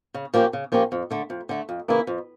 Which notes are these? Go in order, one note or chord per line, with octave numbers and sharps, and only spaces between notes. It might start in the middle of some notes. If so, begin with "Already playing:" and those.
C#3
F3 A#3 C#4 G4
C#3
F3 A#3 C#4 G4
F2
D3 A3
F2
D3 A3
F2
C#3 E3 A#3 E4
F2